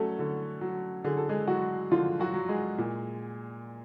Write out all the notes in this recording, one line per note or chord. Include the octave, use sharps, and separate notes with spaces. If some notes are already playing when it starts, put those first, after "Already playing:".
Already playing: F#3 A3 C#4 A4 D5
D3
F#3
D3 G#4
A4
G#3 G#4
F#3 F#4
D3 F3 F4
F#3 F#4
F#3
G#3 G#4
A#2